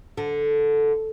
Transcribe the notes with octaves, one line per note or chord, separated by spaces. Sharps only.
D3